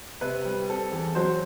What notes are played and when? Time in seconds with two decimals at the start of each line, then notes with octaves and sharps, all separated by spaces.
0.21 C3 B4
0.45 G3
0.69 C4 A4
0.92 E2
1.15 F#3 C5